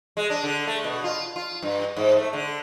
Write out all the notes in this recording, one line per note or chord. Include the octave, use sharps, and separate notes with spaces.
G#3
D4
D3
A3
B2
F4
F4
G2
G#2
A3
D3